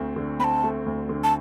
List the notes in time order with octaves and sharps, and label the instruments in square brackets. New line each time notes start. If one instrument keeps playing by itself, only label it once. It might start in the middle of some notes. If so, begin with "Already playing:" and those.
Already playing: [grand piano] D2 A3 C4
D3
[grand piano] C4 [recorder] B5
[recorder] A5
[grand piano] A3
D2
D3
[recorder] A5